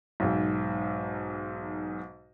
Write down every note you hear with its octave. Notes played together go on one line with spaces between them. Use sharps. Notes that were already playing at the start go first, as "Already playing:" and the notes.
B1 G#2